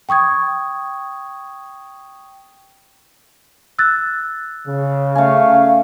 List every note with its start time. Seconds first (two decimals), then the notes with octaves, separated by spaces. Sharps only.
0.09 G5 C#6 D#6 G#6
3.79 E6 F#6 A6
4.67 C#3
5.15 A3 C#4 F5